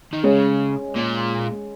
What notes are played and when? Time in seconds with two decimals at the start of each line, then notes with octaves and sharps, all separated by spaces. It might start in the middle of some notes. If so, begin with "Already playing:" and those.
0.13 D#3
0.24 C#3 G#3 C#4 G#4 C#5
0.96 A#2